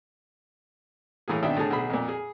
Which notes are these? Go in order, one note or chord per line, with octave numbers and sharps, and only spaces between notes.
A2 E3 A#3 G#4
G#1 B2 D#3 D4 E5 G5
A2 D3 A3 G#4 A5
B1 G#4 B5
F2 A#2
G#4